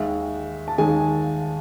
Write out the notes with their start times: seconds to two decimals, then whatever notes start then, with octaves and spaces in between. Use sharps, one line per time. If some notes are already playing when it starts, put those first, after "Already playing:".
Already playing: D#2 D#3 G#3 E5
0.68 A5
0.78 D#2 D#3 G#3 G#5